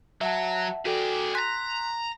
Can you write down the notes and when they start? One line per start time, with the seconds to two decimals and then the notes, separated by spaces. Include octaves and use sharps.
0.21 F#3 E5 F#5 A5
0.85 F#4 G#4 A4 D5 G5
1.35 G#5 A#5 C6 F#6 B6